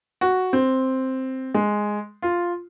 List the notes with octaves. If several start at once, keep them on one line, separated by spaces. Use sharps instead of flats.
F#4
C4
G#3
F4